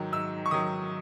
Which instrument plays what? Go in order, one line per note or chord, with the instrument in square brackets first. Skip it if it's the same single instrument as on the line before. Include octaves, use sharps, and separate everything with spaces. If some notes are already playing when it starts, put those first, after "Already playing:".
Already playing: [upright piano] G#2 D#3 F#3
G#2 E6
C#6
D#3 F#3 D#6